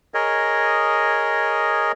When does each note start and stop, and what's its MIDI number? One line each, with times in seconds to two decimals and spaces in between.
0.14 1.92 68
0.14 1.92 70
0.14 1.92 73
0.14 1.92 75